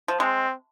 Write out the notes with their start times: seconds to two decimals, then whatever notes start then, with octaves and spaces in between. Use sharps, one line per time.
0.08 F3
0.20 G#3 C4